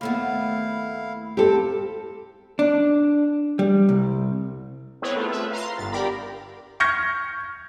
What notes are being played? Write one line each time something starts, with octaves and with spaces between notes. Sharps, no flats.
D#2 A3 B3 E4 F5
C4 G4 A4
D4
G3
C2
B3 C4 E4 G#4 B4 C#5
A3 F4
B4 E5
F5 A#5 C6
G1 B3 A6
G4 A#4 D5 A#5 B5
C#6 F6 G6 G#6 A#6 C#7